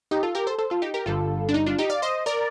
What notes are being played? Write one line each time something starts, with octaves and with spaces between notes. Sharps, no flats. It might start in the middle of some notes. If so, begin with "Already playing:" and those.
D#4 G4
F4 A4
G4 A#4
A4 C5
A4 C5
F4 A4
D#4 G4
G4 A#4
G1 G2 D3 G3 F4 A4
D4
D#4
D4 F4
D#4 G4
D5 F5
C5 D#5
A#4 D5